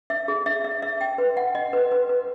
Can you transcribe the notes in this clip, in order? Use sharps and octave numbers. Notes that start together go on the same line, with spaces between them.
E5
G#4
E5
E5
E5
G5
B4
F#5
D#5
B4
B4
B4